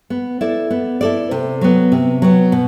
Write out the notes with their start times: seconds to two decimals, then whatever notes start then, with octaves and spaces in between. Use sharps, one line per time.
0.10 B3
0.41 E4 A4 D5
0.70 B3
1.01 E4 A4 D5
1.31 C3
1.61 F#3 B3
1.92 C3
2.22 F#3 B3
2.52 B2